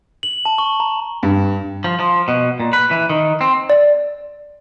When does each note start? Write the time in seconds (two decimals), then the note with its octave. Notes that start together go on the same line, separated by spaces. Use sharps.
0.23 F#7
0.45 A5
0.58 C#6
0.80 A#5
1.23 G2
1.84 F3
2.00 F3
2.28 B2
2.60 A#2
2.73 B4
2.91 E3
3.10 D#3
3.41 C4
3.70 D5